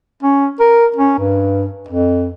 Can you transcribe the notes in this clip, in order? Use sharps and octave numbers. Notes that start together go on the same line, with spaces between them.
C#4
A#4
C#4
G2
F2